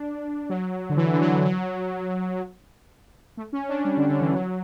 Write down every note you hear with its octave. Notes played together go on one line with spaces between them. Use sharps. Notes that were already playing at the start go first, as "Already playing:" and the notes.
Already playing: D4
F#3
D3
E3
D3
F#3
E3
F#3
A3
C#4
D4
G3
D3
D3
E3
F#3